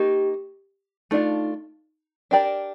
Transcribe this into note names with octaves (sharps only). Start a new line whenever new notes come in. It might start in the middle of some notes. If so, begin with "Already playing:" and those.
Already playing: A#3 D#4 G4 A#4
A3 D4 D#4 F4
D4 G4 A#4 D5